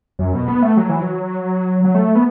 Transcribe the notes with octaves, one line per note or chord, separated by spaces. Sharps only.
F#2
B2
B3
A3
F#3
E3
F#3
F#3
A3
B3